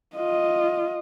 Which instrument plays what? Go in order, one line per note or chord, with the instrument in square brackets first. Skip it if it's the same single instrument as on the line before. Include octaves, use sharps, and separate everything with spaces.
[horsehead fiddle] F4 D#5